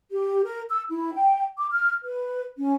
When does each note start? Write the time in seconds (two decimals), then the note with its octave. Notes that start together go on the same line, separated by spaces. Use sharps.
0.11 G4
0.44 A#4
0.70 E6
0.89 E4
1.14 G5
1.57 D6
1.71 F6
2.04 B4
2.58 C#4